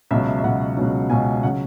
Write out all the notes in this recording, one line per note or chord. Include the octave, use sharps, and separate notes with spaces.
C#2 B2 F#3 E5
E5
E5
C#2 B2 F#3 F#5
C#2 B2 F#3
C#2 B2 F#3 G#5
C#3 F#3 F#5